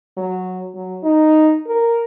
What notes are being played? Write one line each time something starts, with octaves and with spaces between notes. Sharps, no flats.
F#3
F#3
D#4
A#4